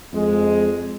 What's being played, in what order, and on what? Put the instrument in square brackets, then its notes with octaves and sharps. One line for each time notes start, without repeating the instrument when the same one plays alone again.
[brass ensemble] F2 G#3